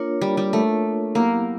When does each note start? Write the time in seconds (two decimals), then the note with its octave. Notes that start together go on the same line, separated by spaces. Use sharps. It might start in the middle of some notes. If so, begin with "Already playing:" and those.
Already playing: A#3 D4 F4 A#4 C#5
0.21 G3
0.37 G3
0.53 A3
1.15 F#3 A#3 B3 E4 G4